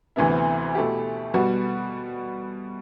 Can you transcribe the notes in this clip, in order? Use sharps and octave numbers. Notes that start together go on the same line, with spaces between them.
D2 C3 E3 B3 E4
B2 A3 E4 G4
B2 G3 B3 F#4